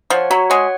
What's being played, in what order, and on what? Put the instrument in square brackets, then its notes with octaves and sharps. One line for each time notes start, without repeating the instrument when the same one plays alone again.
[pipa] F3 [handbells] C#5 F#5
[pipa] F#3 [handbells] F#4
[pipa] G#3 [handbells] C#5 F#5